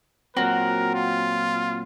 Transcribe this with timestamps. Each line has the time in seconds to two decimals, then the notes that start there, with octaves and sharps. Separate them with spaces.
0.37 A#2 F#3 C4 F#4 A#4
0.94 F4